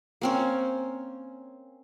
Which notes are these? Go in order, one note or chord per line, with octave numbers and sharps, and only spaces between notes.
A#3 C4 C#4